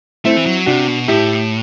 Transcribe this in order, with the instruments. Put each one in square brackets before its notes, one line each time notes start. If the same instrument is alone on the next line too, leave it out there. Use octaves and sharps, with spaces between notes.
[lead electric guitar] A3 [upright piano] C4 E4
[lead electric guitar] E3
F#3
[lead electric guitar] C3 [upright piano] D4 F#4
[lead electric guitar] B2
[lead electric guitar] A2 [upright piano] E4 G4